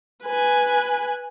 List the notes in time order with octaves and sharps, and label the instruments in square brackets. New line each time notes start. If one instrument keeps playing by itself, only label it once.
[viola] B4 G#5